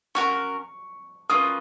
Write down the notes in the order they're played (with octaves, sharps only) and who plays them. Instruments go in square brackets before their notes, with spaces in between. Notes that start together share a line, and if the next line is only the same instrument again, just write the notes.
[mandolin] C#4 F#4 A#4 [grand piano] C#6
[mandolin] A#3 C#4 F4 B4 [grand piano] D#6